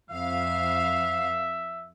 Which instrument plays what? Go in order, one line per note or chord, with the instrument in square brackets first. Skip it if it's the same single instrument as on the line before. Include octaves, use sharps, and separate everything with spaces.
[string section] F2 F5 [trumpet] E5